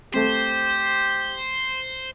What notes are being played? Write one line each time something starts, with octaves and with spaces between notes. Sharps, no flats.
A3 C4 G4 C5